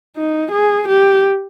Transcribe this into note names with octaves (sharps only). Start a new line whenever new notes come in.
D#4
G#4
G4